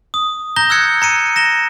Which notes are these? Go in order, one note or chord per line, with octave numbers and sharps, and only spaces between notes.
D#6
A#5 G6 A#6 G7
E6 F#6 G#6 C#7
A#5 C#7 D#7
A#6 E7 G7